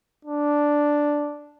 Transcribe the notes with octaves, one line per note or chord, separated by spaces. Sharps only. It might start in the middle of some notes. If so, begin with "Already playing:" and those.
D4